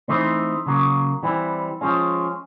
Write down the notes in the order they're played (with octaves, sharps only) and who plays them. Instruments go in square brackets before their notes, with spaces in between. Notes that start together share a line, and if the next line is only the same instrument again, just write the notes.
[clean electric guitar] E3 A3 C4 D#4
C#3 F#3 A#3
E3 G3 C4
F3 G#3 C#4